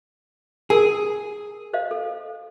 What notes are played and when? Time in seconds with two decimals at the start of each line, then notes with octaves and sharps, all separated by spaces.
0.70 G#4 A#4 G#5
1.73 C5 D#5 F5
1.91 A4